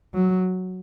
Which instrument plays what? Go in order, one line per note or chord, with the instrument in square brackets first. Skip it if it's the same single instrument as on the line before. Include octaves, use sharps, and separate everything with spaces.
[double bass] F#3